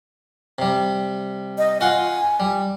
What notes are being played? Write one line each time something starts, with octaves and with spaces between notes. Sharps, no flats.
C3 G3
D#5
F4 F#5 G#5 C6
G3